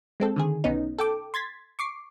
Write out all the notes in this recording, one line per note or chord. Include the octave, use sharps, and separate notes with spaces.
G#3 C4 A4
D3 D#3 G#4
B1 B3 C#4 D#4
A4 G5 D6
C6 G#6 A6 B6
C#6 D6 C7